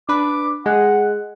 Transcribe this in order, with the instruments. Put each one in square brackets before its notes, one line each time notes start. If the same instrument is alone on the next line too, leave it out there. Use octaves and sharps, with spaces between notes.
[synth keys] D4 B4 [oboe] D6
[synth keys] G#3 [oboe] F#5